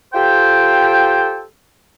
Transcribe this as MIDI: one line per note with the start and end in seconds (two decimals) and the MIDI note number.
0.14 1.41 65
0.14 1.41 67
0.14 1.41 69
0.14 1.41 72
0.14 1.41 79